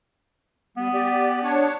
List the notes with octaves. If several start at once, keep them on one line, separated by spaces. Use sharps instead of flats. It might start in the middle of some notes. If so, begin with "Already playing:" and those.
G3 B3
G4 D5
D4 C#5